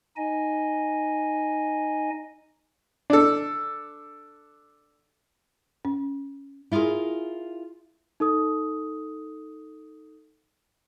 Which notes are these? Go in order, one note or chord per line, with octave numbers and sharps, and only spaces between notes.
D#4 D#5 G#5
D4 A4
C#4
E4 F4 G4 G#4 A#4
D#4 A4 D#6